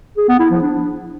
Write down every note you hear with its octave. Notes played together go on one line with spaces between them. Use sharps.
G#4
B3
E4
F3
D4